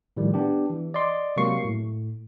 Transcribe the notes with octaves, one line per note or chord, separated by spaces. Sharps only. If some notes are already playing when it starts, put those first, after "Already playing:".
A2 D#3 F3 G3
B3 D4 G4
E3
D5 D#5 C6 D6
C3 F#3 G#3 A#3 C#6 C7
A2